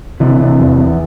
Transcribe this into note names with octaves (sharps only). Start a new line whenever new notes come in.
C3 E3
C3
E2
E2